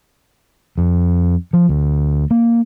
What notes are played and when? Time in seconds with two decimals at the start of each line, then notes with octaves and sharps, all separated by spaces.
0.78 F2
1.53 F3
1.69 D2
2.31 A#3